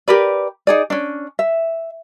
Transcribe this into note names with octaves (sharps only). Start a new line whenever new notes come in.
G4 A#4 B4 D5
D#4 G#4 D5
C#4 D4
E5